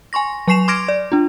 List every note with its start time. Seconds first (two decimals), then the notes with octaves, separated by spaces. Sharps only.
0.13 G#5 C6 C#6 A#6
0.48 F#3 G#5 C#6 C7 E7 F7
0.68 C6 D6 F6 G#6 A#6 D7
0.88 D5
1.12 D4 F4